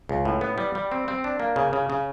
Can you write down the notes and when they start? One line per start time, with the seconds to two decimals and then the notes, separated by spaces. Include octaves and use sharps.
0.09 C#2
0.25 A2
0.41 B3
0.58 G3
0.75 G3
0.92 C4
1.08 C4
1.24 D4
1.40 A#3
1.56 C#3
1.73 C#3
1.90 C#3